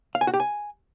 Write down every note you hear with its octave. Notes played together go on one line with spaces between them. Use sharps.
F5
G#5
F#4
G4
G#5